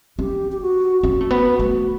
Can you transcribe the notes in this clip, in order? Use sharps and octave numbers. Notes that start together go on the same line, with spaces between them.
C#4 G4
G4
F#4
C#4 F#4
A3
B3
F#4
A3